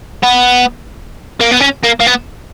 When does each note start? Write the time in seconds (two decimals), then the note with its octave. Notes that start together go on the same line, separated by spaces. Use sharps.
0.23 B3
1.41 A#3
1.51 B3
1.60 C#4
1.83 A#3
2.00 A#3
2.06 B3